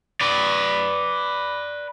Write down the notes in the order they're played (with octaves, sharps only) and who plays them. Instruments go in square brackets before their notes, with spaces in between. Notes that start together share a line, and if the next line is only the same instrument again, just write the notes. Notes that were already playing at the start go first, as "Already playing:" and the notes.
[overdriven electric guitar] B4 D5